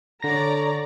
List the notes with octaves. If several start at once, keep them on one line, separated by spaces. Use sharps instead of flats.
D3 C#5 D5 A#5 A#6